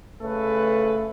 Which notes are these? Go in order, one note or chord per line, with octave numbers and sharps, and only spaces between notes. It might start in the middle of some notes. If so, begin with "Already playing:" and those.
C#3 A3 A4 B4